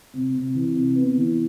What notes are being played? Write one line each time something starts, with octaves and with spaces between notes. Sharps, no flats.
C3
C3
E3
C3
B3
E3